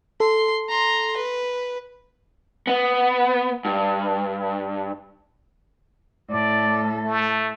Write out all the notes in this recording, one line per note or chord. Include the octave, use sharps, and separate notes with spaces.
A4 C6
A#5 C6
B4
B3
G2
A2 A4 D5
A3